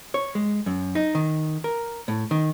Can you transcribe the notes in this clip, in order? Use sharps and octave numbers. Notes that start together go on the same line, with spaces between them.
C#5
G#3
F#2
D#4
D#3
A#4
A2
D#3